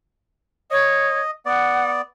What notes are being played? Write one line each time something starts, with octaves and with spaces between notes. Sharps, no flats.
C#5 D#5
B3 D5 F#5